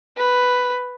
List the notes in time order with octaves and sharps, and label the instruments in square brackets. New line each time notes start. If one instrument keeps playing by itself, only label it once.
[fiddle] B4